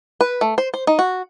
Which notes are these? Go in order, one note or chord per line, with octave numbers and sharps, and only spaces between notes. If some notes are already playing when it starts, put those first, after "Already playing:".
B4
A3
C5
C5
D#4
F#4